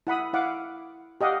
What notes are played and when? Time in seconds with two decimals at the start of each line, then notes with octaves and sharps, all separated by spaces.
0.07 E4 F#5 B5 D#6
0.33 E4 F5 F#5 D6
1.21 G4 D#5 F5 F#5